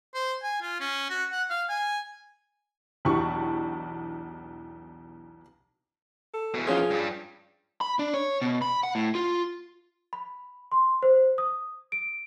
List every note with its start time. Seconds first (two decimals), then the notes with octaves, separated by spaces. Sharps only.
0.14 C5
0.43 G#5
0.62 F4
0.80 C#4
1.10 F#4
1.32 F#5
1.50 F5
1.69 G#5
3.05 B1 E2 D4 G4 C#6
6.34 A4
6.54 E2 B2
6.67 F3 C#4 F4 G#4
6.90 G2 G3
7.81 B5
7.99 D4
8.14 C#5
8.42 B2
8.62 B5
8.83 F#5
8.95 A2
9.15 F4
10.13 B5
10.72 C6
11.03 C5
11.38 D#6
11.92 D7